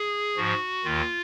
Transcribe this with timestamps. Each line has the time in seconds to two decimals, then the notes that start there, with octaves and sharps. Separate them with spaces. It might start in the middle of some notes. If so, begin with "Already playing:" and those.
Already playing: G#4
0.37 G#2 F3 F#4
0.84 D#2 D#3 F4